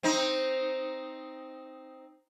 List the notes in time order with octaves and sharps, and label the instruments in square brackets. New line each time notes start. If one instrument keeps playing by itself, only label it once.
[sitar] C4 D#4